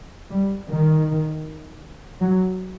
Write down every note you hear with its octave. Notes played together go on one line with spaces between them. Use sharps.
G3
D#3
F#3